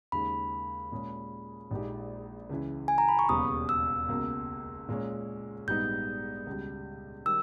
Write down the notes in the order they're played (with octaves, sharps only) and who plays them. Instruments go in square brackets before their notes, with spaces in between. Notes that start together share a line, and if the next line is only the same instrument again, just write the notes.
[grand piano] D#2 C#3 G#3 D#4 [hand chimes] B5
[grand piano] A#2 G#3 C#4 G#4
A#1 A#2 G#3 D#4 G4
C#2 C#3 E3
[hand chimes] G#5
A#5
B5
C#6
[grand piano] E1 D#2 C#3 G3 B3 [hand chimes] D#6
[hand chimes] E6
[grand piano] C#2 B2 A#3
A#2 G#3 C#4
[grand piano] A#1 G#2 G3 B3 D#4 [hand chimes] G6
[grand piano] C#2 B2 G3
[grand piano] D#3 G3 [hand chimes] E6